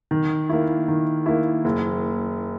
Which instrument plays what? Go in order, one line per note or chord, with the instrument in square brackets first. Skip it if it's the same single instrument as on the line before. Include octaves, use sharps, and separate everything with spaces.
[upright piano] D#3
A#3 E4
D#3
A#3 E4
F#1